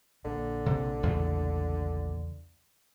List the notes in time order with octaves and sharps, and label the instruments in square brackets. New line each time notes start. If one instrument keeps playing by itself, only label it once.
[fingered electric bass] A#1 A#3 [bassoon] D3
[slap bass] C3
E2 C#3 A3